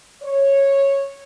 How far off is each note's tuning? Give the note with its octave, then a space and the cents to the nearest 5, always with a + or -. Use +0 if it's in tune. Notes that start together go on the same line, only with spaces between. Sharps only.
C#5 -10